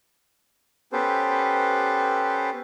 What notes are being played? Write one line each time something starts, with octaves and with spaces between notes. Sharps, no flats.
B3 C#4 G4 A4 B4 C5